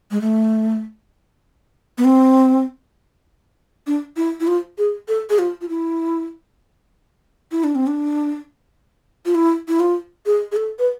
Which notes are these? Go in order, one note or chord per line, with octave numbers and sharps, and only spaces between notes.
G#3
A3
B3
C4
D4
E4
E4
F4
G#4
A4
G#4
F4
F4
E4
E4
D4
C4
D4
F4
E4
E4
F4
G#4
G#4
A4
B4